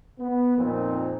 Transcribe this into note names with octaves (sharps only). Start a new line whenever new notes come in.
B3
F2 A#2 F3 A#3 C4 D#4